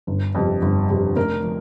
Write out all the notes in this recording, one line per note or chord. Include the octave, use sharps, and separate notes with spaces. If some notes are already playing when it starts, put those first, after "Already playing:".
G1
F2 C3 G3
G1
F2 C3 G3
F1 A#4
F3